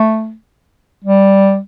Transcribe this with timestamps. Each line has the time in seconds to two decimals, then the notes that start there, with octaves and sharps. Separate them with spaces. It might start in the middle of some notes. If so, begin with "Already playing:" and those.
Already playing: A3
1.04 G3